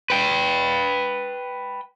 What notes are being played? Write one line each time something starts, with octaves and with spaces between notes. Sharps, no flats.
B4 G5